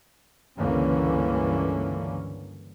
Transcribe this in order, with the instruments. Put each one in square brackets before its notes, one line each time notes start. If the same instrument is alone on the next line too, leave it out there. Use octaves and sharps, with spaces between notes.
[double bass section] C#2 G2 D3 E3 A#3 C#4